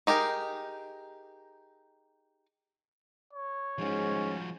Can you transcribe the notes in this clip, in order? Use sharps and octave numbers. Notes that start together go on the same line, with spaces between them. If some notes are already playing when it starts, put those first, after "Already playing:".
D#4 G4 G#4 A#4
C#5
G#2 F3 C#4 F#4